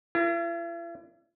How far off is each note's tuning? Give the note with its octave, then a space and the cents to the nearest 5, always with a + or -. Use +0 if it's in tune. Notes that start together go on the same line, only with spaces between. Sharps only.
E4 +45 A#4 -20